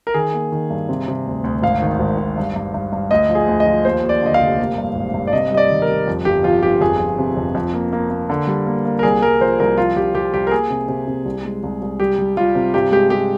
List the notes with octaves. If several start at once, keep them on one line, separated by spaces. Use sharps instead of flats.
A#4
D#3 G#4
A#3
D#3
G2
C3
C3
D2
D2
G#1 F5
D#3
G#1
G#1
G2
G2
G2
G2
D2 D#5
F3
G#4
D2
D#5
F3
D#2 C5
D#2
D5
D3 D#5
F5
F1
A#3
G2
G#1
G2
D5
C3 D#5
G3 D#5
D5
D#3
A#4
G3
F2
G1 G4
F2 F4
G1 G4
F2 G#4
F2
C3
F2
F2
A#3
A#3
A#3
D3
G3
A#3
A#3
A#4
C2 G#4
C2 A#4
F3 C5
C2 A#4
F3 F4
C2 G4
C2 G4
C2 G4
A#4
A#3 G#4
C3
C3
C3
C2
G#3
C2
C2
G3 G4
G3
G3 F4
C3
G2 G4
G#3 G4
G#3 G4